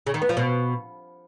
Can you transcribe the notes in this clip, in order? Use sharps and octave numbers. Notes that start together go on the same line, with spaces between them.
C#3
D#3
B3
F3
B2